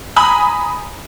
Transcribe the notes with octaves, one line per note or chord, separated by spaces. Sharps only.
G#5 A#5 B5 D#6 F#7